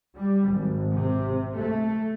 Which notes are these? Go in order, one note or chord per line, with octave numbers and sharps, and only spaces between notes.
G3
G#1
C3
A3